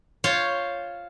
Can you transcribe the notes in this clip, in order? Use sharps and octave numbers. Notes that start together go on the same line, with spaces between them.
F4 C5 C#5